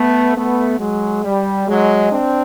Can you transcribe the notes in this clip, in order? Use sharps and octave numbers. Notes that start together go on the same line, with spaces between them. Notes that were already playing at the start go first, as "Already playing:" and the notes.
Already playing: A3 B3
A3 B3
F#3 G#3
G3
F#3 G#3
C4 D4